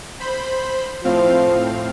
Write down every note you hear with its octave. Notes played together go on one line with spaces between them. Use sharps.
C5 B5
A2 F3 C4 F5